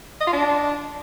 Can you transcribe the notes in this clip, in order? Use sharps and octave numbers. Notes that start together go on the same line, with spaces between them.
D#5
F4
D4